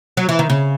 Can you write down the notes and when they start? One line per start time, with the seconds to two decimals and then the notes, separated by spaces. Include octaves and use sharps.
0.17 F#3
0.29 E3
0.39 D#3
0.50 C#3